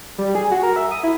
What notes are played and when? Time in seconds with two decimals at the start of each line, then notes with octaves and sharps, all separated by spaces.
0.18 G3
0.35 G#4
0.51 F#4
0.63 A#4
0.76 E5
0.91 D#6
1.03 E4